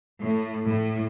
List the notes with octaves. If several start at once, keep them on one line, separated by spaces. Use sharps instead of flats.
A2
A2